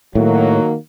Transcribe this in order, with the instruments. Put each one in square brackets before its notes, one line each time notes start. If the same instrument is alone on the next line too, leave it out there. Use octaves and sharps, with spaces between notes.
[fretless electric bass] A2 [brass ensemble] D#3 F#3 A#3